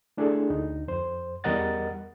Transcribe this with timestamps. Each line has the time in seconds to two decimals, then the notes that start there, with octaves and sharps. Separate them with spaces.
0.17 A3 D4 E4 G#4 A4
0.50 D2 D#4
0.88 F2 C5
1.44 E2 G3 A#4 D#5 F#5 A6